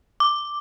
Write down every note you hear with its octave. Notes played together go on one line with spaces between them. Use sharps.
D6